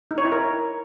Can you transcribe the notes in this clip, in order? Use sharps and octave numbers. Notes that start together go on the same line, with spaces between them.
D#4
C#5
E4
A#4